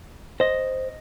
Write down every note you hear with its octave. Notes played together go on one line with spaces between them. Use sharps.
C5 D#5